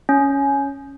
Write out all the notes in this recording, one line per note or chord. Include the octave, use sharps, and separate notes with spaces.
C#4